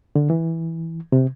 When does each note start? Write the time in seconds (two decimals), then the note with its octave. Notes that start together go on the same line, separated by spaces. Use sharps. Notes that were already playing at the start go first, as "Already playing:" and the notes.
0.16 D3
0.30 E3
1.12 C3